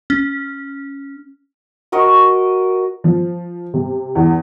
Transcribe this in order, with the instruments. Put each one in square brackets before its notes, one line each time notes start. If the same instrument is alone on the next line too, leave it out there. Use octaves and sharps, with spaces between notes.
[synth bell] C#4
[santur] F#4 A#4 D#5 C#6
[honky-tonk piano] F3
C3
E2